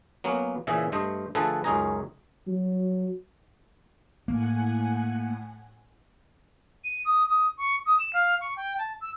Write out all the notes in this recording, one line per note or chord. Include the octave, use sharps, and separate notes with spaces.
F#3 A#3 B3 C#4
A#2 C#3 E3 G#4 E5
G2 A3 C5 D#5
D3 F3 A3 G#4 A4 B4
C#2 F#2 C#4 D#4 G#4 A#5
F#3
A2 A#3 F#5 G#5
D#7
D#6
D#6
C#6
D#6
E7
F5
C#6
G5
A5
E6